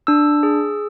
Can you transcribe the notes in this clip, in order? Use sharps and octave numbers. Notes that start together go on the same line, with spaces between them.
D4 E6
G#4